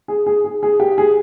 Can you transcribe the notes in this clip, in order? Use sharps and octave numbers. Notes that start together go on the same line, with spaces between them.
G#4
G#4
G#4
G#4
G4
G#4